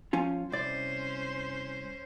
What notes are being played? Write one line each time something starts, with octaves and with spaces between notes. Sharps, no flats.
F3 C#4 F4
C2 C#4 C5 D5